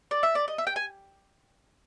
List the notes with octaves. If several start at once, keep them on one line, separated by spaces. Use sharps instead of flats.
D5
E5
D5
D#5
E5
G5
G#5